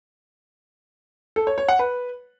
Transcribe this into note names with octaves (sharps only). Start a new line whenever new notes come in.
A4
C#5
C#5
F#5
B4